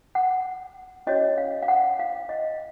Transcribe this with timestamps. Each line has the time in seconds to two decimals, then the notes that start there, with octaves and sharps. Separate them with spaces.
0.15 F#5
1.07 C#4 F#4 C#5 D#5
1.38 F5
1.63 F5
1.68 F#5
1.99 F5
2.29 D#5